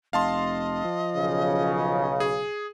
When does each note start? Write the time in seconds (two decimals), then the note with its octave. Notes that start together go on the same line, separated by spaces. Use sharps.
0.13 F1 D#5 F5 A5 C6
0.85 F3
1.16 B1 C#3
2.20 G#4